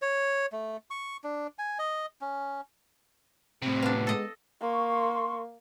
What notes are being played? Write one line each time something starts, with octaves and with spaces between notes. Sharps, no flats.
C#5
A3
C#6
D4
G#5
D#5
C#4
A2 C3 C4
B3 D4 F5
G#3 A4 D#5
A#3 C6 C#6